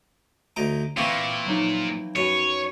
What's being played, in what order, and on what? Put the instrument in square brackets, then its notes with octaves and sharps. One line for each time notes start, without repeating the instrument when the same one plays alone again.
[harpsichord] D2 D#4 D6 [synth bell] A#5
[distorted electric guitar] A#2 [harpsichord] E3 A#3 C4 [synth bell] C#6 D6 E6
[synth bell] F3 F#3 D#4
[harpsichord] F#2 B4 [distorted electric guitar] C#5